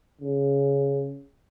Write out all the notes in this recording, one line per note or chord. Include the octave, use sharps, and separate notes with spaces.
C#3